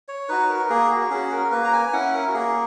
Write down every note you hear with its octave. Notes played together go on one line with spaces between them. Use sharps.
C#5
D#4 F#4 B4
A#4
A#3 G#4
F#4
C#4 F#4 G#4
A#4
A#3 B4
A#5
G#5
C#4 E4 F#5
A#4
F#4
A#3 G#4